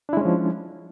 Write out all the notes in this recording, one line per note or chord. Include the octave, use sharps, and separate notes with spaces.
F3 G#3 C#4 D4 E4